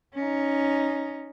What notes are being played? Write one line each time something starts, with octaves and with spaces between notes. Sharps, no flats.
C#4 D#4